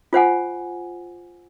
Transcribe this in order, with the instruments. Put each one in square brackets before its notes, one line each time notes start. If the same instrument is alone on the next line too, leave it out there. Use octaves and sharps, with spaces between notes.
[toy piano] F4 C5 F#5 G#5